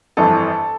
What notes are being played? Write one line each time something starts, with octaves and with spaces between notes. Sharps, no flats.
G1 F2 E3 A4